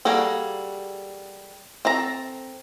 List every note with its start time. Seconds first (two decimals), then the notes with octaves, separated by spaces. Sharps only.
0.05 G3 A#3 F#4 G#4 A4
1.85 C4 A4 A5 A#5